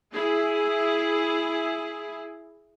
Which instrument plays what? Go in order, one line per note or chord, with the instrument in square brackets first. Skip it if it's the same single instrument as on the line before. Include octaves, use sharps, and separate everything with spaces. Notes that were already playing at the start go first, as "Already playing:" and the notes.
[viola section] E4 G#4